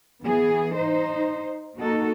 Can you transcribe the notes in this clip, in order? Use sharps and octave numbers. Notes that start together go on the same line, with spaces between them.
E3 B3 G#4
D#4 C5
A#3 D#4 F#4 A4